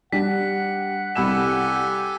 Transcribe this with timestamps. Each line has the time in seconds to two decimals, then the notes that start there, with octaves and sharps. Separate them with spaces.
0.12 G3 D4 F#5 B6
1.15 C2 G4 A4 G#5 B5 E7